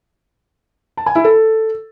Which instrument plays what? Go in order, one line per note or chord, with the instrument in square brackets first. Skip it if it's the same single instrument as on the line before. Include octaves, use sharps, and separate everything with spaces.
[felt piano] A5
G#5
E4
A4